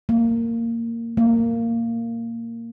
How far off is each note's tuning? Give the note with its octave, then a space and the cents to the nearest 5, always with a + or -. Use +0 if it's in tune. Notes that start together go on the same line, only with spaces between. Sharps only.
A#3 -15
A#3 -15